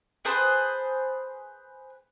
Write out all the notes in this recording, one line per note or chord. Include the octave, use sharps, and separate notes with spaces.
G#4 B4 C5 A5